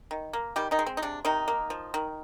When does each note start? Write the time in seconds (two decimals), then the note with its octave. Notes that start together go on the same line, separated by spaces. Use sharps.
0.11 D#3
0.33 A#3
0.56 D#3 G3 G4
0.71 D#3 D#4
0.79 G#3
0.86 C4
0.97 D#4
1.02 C3 D4
1.25 C3 D#3 D#4
1.48 A#3
1.70 F3
1.94 D#3